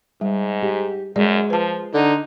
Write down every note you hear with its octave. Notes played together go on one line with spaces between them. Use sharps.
G#2 G3
G4
F#2 G#3 D5
F3 B4 A5
D3 D#4